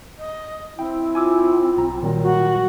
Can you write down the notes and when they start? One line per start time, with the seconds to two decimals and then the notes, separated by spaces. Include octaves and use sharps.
0.19 D#5
0.79 C4 E4 G5
1.15 F4 G#5 D6 E6
1.77 B1 A#5
2.02 A#2 D#3 F#3 G3
2.22 F#4